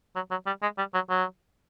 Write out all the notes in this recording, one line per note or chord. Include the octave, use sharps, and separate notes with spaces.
F#3
F#3
G3
G#3
G3
F#3
F#3